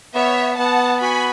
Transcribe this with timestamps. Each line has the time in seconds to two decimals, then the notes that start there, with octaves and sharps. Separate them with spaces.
0.15 B3 C#5 E5
0.58 B3 F#5 A5
1.02 F#4 G#5 B5